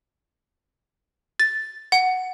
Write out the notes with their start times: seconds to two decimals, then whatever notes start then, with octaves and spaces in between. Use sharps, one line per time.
1.40 A6
1.92 F#5